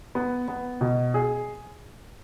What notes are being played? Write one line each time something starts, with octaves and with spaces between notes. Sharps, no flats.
B3
B3
B2
G#4